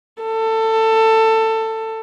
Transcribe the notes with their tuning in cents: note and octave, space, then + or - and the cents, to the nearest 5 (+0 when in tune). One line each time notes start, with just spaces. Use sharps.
A4 +20